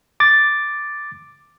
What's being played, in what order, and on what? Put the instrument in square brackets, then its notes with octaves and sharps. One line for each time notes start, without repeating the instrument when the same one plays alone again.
[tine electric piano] D6 A6